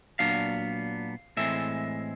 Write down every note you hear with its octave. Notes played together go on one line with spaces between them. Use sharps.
A#2 F#3 B3 D4 F5
A2 E3 G#3 C4 E5